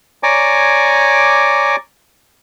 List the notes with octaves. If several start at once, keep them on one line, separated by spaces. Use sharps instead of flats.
C#5 D5 G#5 A#5 D6